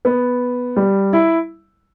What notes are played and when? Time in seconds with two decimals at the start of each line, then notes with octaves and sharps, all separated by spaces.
0.05 B3
0.76 G3
1.13 E4